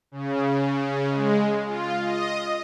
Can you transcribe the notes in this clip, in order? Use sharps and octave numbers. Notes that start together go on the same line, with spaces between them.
C#3
G#3
F4
D#5